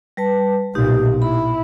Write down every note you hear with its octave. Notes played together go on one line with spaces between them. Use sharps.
G3 B4 A5
B1 A#2 D#4 G4
E4 B5